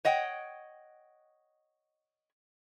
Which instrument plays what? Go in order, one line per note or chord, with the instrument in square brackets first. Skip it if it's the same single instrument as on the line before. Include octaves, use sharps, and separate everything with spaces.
[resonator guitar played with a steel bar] C#5 D#5 F#5 G5